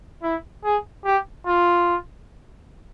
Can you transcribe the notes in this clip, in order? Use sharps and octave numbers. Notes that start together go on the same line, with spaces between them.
E4
G#4
G4
F4